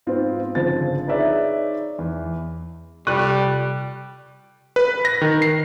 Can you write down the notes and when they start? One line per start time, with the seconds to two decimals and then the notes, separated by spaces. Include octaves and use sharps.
0.07 G#2 B3 C4 F4
0.55 G1 C#3 F3 C4 A6
1.07 D#4 G#4 B4 C#5 D5 E5
1.99 E2
3.07 C3 G3 F#6
4.76 B4
5.05 A#6
5.21 D#3
5.42 C7